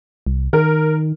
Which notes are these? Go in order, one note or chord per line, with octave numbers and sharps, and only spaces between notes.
C2
D#3 A#4